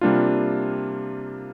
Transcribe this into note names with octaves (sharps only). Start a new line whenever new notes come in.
C3 G3 A#3 D4 F4